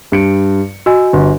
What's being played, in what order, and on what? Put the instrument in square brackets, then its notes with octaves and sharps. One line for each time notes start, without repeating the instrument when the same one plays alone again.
[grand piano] G2 C#7 D7
[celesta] F#4 D#5 G#5 [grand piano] E6
[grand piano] G1